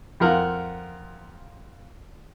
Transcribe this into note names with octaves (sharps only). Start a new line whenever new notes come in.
F2 F4 A#4 F#5